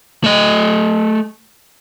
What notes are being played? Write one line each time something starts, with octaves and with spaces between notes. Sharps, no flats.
A3 D#5